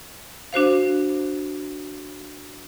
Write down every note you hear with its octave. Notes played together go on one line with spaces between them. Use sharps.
D4 F#4 C5 F5